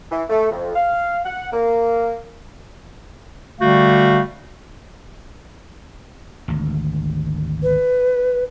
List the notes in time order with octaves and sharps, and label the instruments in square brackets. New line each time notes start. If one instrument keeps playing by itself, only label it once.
[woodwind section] E3
A3
F2
F5
F#5
A#3
D3 G3 A3 F#4 F5
[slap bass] G#1 D2
[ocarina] B4